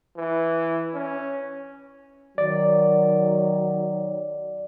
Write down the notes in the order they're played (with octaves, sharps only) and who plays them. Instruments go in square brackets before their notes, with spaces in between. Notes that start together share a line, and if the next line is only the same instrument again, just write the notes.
[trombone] E3
C#4
[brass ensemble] D#3 F#3 [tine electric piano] D5